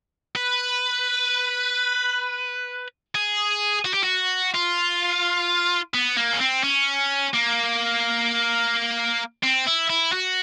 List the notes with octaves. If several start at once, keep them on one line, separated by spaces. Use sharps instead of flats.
B4
G#4
F#4
G4
F#4
F4
B3
A#3
C#4
C4
C#4
A#3
C4
E4
E4
F#4